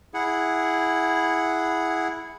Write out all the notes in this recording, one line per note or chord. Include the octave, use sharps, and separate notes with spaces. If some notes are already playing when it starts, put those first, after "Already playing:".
E4 G#4 F#5